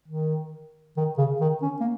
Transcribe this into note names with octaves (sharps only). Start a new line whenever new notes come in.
D#3
D#3
C#3
D#3
C#4
A#3